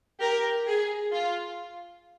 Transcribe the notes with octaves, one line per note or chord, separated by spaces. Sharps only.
G4 A#4
G#4
F4